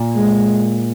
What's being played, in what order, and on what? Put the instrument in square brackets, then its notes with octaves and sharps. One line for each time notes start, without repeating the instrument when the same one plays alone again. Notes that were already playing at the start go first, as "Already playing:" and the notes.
Already playing: [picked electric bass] A#2
[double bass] G#3